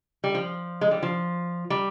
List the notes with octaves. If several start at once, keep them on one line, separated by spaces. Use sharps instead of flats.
G3
F3
G#3
G3
F3
G3